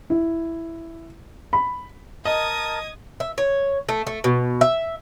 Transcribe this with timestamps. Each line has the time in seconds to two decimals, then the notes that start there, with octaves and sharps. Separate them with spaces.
0.10 E4
1.53 B5
2.25 A#4 D#5 A5 D#6 G#6
3.20 E5
3.38 C#5
3.89 A3
4.07 A3
4.24 B2
4.61 E5